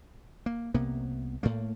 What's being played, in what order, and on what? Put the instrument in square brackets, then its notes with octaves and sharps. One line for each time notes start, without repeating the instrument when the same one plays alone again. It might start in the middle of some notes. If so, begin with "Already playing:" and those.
[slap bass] A#3
C2 C3 A#3 B3
A2 A3 A#3